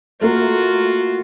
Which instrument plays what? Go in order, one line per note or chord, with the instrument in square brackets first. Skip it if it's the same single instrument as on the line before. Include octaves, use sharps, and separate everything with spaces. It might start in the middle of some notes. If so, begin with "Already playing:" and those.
[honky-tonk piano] A3 A#3 A#4 [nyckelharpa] F4 F#4